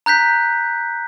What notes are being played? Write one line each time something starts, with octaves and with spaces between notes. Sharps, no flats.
A#5 F#6 G6 B6